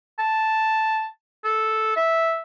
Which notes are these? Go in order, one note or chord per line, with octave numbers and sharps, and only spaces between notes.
A5
A4
E5